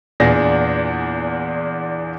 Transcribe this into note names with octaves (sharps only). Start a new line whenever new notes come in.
E2 A#2 D4 G#4 A#6